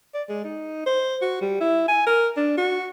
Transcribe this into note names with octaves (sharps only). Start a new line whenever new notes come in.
D5
G#3
D#4
C5
F#4
G3
E4
G#5
A#4
D4
F#4